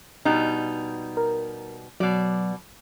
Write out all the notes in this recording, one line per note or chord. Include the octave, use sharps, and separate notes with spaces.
B2 G3 D#4
A#4
B2 F#3 D5